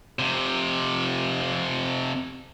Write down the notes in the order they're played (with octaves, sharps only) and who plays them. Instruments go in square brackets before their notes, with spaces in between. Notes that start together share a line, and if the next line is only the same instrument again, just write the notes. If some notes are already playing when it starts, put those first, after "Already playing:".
[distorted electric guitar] F2 C3